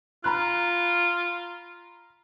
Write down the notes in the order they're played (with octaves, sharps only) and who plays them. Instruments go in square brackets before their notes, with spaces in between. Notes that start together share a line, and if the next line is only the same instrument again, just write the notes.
[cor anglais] F4 [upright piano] A#5 B5 F#6